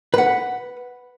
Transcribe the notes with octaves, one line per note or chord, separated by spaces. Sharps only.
B4 F#5